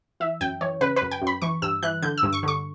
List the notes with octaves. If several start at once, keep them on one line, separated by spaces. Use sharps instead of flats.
E3 E5
F#2 G5
E3 C#5
C#3 B4
B4
F#2
G5
F#2
B5
E3 C#6
G2 E6
E3 F#6
D3 G6
E6
G2
C#6
D3 C#6